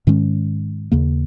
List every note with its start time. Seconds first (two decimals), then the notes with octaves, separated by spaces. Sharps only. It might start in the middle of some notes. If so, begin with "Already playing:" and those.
0.07 G#2 D#3 G#3 C#4
0.92 D#2 C#3 A#3